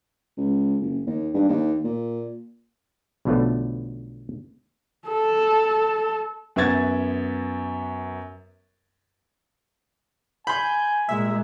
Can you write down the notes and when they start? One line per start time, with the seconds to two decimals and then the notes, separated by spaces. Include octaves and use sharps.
0.37 C#2
0.82 F#1
1.07 D#2
1.34 G2
1.49 D#2
1.84 A#2
3.25 B1 B2 D3 F3 A3 B3
5.08 A4
6.56 F#2 B3 E5 G#6 A6
10.47 G#5 B5 C6 G6
11.09 A#2 G#3 E5